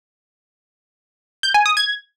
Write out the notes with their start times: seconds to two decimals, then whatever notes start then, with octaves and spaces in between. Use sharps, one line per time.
1.43 G6
1.54 G#5
1.66 D#6
1.77 G#6